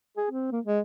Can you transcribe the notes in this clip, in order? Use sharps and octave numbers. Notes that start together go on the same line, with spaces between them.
G#4
C4
A#3
G#3